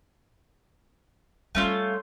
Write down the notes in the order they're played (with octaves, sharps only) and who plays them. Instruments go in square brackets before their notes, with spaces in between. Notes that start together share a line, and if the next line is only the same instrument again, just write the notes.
[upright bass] G3 [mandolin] A3 C#4 F4